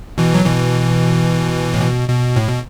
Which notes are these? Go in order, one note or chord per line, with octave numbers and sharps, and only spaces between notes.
B2 E3
F#3
B2 E3
A2
B2
B2
A2
B2